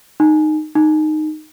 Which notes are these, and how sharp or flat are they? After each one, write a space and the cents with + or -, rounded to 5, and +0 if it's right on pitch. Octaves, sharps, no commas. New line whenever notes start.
D#4 -15
D#4 -10